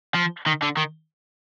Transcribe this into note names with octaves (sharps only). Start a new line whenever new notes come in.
F3
D#3
D3
D#3